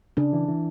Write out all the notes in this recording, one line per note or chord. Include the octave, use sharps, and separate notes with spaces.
C#3 D4
E3
E3